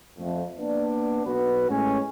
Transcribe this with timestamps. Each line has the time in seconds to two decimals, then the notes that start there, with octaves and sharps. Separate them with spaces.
0.18 F2 A3
0.58 A#3 B3 D4
1.26 B1 B3 F#4 B4
1.70 A2 G#3 C#4